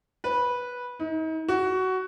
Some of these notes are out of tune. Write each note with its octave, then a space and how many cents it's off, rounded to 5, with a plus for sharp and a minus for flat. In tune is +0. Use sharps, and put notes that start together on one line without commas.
B4 -10
D#4 +40
F#4 +15